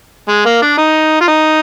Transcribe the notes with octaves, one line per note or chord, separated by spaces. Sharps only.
G#3
A#3
D4
D#4
F4
D#4